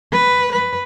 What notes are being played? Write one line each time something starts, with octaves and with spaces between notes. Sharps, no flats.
B4
B4